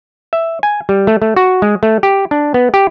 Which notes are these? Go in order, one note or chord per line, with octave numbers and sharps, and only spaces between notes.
E5
G#5
G3
A3
A3
F#4
G#3
A3
G4
D4
B3
G4